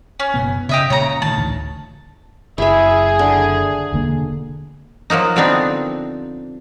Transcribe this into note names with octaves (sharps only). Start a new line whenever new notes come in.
C#4
F#1 B2 B3
C#3 G4 D#5 E5
A#2 C#3 G#3 C#5 A#5
D3 D#3 A3 A5
A1 D2 D4
F#1 E4 G#4 E5
D3
E1 D3 A#3
F3 F#3 A#3 D#4
D3 F3 B3 C4 D4 D#4